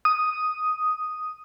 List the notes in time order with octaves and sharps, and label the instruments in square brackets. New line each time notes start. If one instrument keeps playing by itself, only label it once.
[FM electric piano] D#6